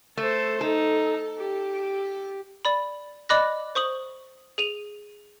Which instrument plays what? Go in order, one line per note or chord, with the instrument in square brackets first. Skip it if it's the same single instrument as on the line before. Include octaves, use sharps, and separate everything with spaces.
[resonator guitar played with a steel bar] A3 [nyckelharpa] A4 C5
[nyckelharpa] D#4 [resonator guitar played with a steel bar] A4
[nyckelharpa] G4
[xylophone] D5 B5
D5 D#5 B5 D6 F#6 A#6
C5 C#6 D#6 F#7
G#4 D#7 F7